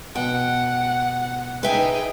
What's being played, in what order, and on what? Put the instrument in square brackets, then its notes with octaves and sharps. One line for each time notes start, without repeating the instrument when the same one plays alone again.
[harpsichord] B2 [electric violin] F#5 [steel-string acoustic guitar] G5
[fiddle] D#4 G5 [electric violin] G#4 [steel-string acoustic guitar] B4 E5 G#5